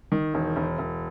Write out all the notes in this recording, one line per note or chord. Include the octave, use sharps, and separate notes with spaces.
D#3
E1
E1
E1